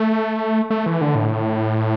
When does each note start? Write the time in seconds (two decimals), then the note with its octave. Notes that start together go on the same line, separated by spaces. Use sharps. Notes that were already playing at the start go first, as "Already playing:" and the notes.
Already playing: A3
0.70 A3
0.86 E3
1.01 D3
1.15 A2